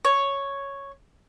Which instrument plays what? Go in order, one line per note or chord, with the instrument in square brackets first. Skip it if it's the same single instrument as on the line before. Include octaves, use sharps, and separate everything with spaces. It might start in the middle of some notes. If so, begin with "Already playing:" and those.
[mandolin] C#5